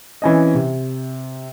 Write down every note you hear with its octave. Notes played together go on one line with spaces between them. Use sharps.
E3 C4 C#4 C5 D#5
C3